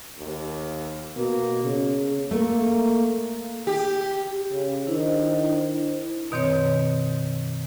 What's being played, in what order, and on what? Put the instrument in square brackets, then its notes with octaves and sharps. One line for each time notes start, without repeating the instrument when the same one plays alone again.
[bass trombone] D#2
[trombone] B2 [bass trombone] A#3
[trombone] C#3
[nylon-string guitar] A3 [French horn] A#3
[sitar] G4
[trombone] C#3
[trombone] D#3 [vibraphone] D4 E4 C5
[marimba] F#2 B2 D#3 C4 C#5